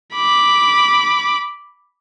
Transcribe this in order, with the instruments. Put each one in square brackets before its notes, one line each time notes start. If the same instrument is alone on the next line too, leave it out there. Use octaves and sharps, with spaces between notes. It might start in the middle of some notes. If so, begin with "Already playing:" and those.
[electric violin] B5 D6